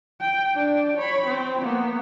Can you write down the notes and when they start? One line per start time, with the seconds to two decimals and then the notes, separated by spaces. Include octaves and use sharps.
0.20 G5
0.55 D4 D5
0.98 C#5 B5
1.27 C4
1.62 A#3 B3